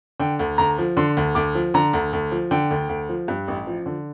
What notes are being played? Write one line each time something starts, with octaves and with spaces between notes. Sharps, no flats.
D3 G5
D2
D2 A#5
F3
D3 C6
D2
D2 D6
F3
D3 A#5
D2
D2
F3
D3 G5
D2
D2
F3
G2
A1
F3
D3